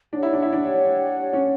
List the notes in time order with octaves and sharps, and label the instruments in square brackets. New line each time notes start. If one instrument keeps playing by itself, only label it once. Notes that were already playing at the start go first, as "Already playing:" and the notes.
[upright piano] D4 [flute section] G4 C#5 F#5
[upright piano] E4
D4
E4
D4
C#4